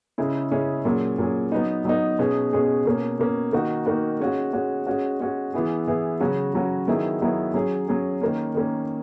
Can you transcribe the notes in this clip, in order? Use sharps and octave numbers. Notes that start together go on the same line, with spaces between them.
C#3 G#3 C#4 E4 G#4
C#3 G#3 C#4 E4 G#4
A#2 F#3 C#4 G#4
A#2 F#3 C#4 G#4
F#3 B3 D#4
F#3 B3 D#4
B2 G#3 C#4 G#4
B2 G#3 C#4 G#4
B2 A#3 C#4
B2 A#3 C#4
D#3 A#3 D#4 F#4
D#3 A#3 D#4 F#4
G#3 C#4 F#4
G#3 C#4 F#4
G#3 C#4 F#4
G#3 C#4 F#4
E3 B3 E4 G#4
E3 B3 E4 G#4
C#3 F#3 C#4 F#4
C#3 F#3 C#4 F#4
D#3 F#3 B3 E4 G#4
D#3 F#3 B3 E4 G#4
F#3 C#4 G#4
F#3 C#4 G#4
D#3 A#3 C#4
D#3 A#3 C#4